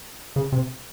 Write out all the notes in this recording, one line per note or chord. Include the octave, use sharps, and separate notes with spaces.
C#3
C3